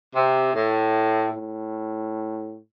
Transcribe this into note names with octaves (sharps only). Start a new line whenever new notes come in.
C3
A2
A2